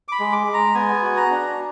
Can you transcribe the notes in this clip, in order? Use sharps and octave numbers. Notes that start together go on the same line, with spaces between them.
D6
B5
G#3
D6
G#3
A#5
B3 G#5
F#4
A#5
D4